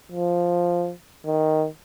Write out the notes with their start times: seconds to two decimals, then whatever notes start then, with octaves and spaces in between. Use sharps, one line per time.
0.12 F3
1.26 D#3